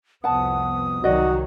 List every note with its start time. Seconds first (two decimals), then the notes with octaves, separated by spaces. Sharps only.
0.24 C2 F2 B3 F#5 A5 D#6
1.04 C2 D#3 F#3 F#4 D5 D#5